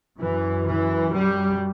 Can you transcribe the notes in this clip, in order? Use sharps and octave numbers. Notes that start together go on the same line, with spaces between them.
F#2 E3
E3
G3